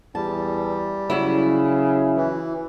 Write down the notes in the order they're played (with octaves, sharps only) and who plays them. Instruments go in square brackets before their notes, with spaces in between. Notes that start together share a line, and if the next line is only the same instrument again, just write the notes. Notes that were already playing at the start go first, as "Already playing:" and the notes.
[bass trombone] E2 [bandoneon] G3 [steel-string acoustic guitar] A5
[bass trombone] C#3 [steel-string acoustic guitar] F#3 E4
[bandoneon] E3